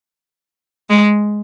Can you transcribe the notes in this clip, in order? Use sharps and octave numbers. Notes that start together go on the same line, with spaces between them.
G#3